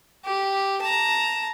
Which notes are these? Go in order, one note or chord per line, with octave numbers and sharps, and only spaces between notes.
G4
A5 A#5